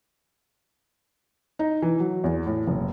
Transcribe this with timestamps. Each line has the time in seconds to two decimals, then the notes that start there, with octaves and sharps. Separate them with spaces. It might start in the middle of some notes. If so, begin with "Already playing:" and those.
1.59 D#4
1.82 E3
2.00 F#3
2.24 E2
2.46 A2
2.67 F#1